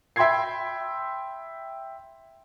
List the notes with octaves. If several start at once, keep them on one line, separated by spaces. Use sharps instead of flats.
E5 G5 B5 C6 G#6 C7